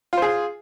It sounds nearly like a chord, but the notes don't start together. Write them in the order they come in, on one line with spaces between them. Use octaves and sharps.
F4 C5 G#4